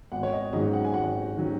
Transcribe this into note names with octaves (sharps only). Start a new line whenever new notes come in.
G#1 F#5
C#5
D#5
G#2 D#3 F#3 C#4 D#5
F#5
G#5
G#1 F#5
D#3 F#3 C#4